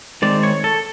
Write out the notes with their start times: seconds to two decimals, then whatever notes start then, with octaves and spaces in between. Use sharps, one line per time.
0.22 D#3 G#3 C4 D5
0.43 C#5
0.64 A4